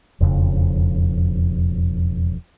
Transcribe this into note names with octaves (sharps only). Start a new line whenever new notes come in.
E1 F2 C#3 F3